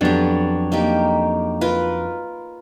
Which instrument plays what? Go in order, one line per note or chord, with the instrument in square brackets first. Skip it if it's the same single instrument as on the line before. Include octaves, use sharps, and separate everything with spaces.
[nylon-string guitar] F2 F#3 D4 [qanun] B3 G4
[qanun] A#3 D#4 G4
F4 A#4 B4